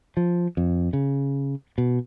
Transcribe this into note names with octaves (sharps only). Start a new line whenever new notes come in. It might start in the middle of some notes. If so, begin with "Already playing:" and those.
F3
F2
C#3
B2